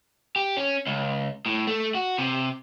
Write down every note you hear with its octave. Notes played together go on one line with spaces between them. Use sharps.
G4
C#4
C#2
A2
A3
F#4
C3